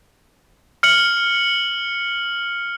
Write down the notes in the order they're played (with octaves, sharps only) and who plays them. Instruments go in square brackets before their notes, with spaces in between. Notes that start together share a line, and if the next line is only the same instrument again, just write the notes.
[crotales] F6 C#7 F#7